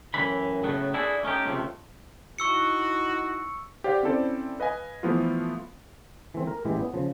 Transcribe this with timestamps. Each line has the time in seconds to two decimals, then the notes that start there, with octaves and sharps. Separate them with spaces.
0.14 F#2 A2 E3 B5
0.64 A2 C#3 F#3 A3 B3
0.94 D4 E4 F#4 G#4 A4
1.23 A3 C#4 D#4 G4
1.45 C#2 C3 F3 A3
2.38 D#4 E4 F#4 C#6 E6 C#7
3.84 G4 C5 D5 F5 F#5
4.03 C4 C#4 E4 A4 C5 D5
4.60 B4 D#5 F5 G#5
5.03 E3 F3 A3 B3 E4 F4
6.34 E3 A3 C4
6.47 A#4
6.65 A1 E3 G#3 E4 G4
6.79 B3
6.94 C#3 F3